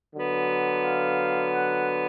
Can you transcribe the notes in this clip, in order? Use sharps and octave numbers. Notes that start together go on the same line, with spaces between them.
D3 F#3 B3
F5
F#5